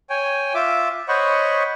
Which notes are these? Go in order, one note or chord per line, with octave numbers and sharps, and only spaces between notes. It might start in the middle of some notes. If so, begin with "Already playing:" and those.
C#5 G5 G#5
F4 E5 D6
C5 C#5 D#5 F#5 B5 C#6